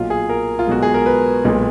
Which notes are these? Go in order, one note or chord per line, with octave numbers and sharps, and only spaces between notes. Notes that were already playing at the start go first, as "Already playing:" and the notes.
Already playing: B1 A#2 F#3 F4
G#4
A#4
F4
B1 B2 G#3 F#4
G#4
A#4
B4
B1 A#2 G#3